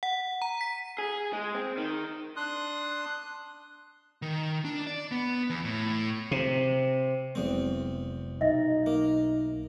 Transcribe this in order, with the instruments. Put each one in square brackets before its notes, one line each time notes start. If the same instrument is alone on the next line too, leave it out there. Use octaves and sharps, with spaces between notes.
[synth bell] F#5
A#5
B6
[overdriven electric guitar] G#4
G#3
C4
D#3
[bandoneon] D4 C6 D#6 F#6
[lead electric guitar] D#3
D4
D5
B3
E2
A2
[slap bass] C3
[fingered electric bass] F1 F#3 G#3 [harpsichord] E2 C4
[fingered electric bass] B1 [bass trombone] D#4 [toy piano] D#5 E5
[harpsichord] A#3